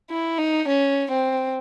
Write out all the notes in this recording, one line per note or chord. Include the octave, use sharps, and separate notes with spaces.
E4
D#4
C#4
C4